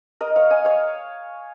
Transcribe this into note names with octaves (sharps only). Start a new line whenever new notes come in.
A#4 D#5
C#5 F5
D#5 G#5
C#5 F5